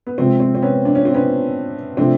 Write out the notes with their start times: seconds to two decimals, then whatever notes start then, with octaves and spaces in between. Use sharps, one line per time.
0.07 B3
0.18 C3 F3 G#3 C4
0.40 C4
0.55 C4
0.62 B3 C#4
0.85 D4
0.95 C#4
1.05 C4
1.14 B3 C#4
1.97 C3 F3 A3 C4 D4